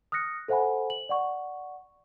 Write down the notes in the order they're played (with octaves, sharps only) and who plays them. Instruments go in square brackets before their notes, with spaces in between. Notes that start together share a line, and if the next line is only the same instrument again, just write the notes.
[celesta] D#6 F6 F#6 A#6 C#7
A4 C5 E5 F#5 G#5 B5
F#7
D5 F#5 C#6